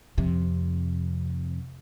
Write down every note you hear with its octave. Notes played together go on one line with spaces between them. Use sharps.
F2 C3